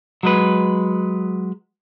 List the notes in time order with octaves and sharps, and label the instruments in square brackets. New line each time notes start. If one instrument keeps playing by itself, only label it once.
[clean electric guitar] F#3 G#3 B4